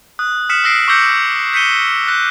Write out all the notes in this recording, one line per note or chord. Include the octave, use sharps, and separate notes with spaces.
D#6 F#6
D#6 F6 B6 C#7 E7 F#7
D#6 E6 A#6 C7 D7
C#6 D6 E6 G6 A#6 C#7
G6 B6 C#7 D#7 G7
F#6 A#6